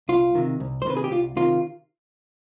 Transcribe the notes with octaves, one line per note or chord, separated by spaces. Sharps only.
C2 F4
C3 D#3
C2
C5
C3 D#3 B4
G#4
G4
C2 F4
C3 D#3 F4